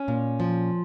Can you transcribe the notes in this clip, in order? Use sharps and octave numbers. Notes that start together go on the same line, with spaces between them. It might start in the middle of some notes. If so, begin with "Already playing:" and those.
Already playing: C#4
A#2
F3